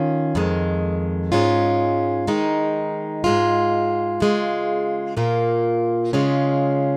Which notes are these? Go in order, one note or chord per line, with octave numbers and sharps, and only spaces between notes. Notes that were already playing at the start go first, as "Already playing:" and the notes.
Already playing: D#3 C#4 F4
F2 D#3 G#3
G#2 G#3 C#4 F4
D#3 G#3 D#4
G#2 G#3 F4
C#3 G#3 F4
A#2 A#3 F4
C#3 G#3 C#4 F4